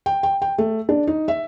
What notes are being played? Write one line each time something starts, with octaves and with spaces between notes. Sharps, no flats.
G5
G5
G5
A3
D4
D#4
E5